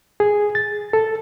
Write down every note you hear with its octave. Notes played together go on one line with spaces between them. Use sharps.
G#4
A6
A4